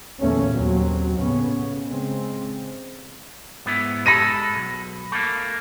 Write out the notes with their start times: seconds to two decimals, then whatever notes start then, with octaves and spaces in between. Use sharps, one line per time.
0.21 G1 E2 A#2 A3 A#3 C#4
0.53 D#2 F#3 C4
1.17 A2 C#3 B3 C#4
1.86 C#3 G#3 C4
3.66 G#2 B3 E4
4.06 G#3 A4 B5 A#6 D#7
4.55 B1
5.12 A3 A#3